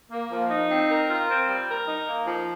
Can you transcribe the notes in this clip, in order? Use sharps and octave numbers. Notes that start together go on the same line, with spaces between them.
A#3
F3
D#4
C4
A#4
F4
C4
G3
A#4
D#4
A#3
F3